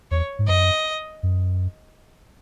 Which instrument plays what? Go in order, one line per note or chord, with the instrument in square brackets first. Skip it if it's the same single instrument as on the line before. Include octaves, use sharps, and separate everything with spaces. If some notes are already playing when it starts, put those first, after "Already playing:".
[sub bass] E2 [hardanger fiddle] C#5
[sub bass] G#2
[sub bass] F#2 [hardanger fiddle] D#5
[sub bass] F#2